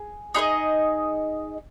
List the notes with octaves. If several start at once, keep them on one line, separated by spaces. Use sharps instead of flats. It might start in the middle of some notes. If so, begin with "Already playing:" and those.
Already playing: G#4
D#4 G#4 B4 D#5